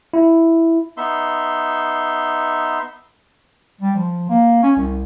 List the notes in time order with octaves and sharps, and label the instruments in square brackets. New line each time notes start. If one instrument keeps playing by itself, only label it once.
[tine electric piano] E4
[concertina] B3 D#4 E5 C6
[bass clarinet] G3
F3
A#3
C#4
C2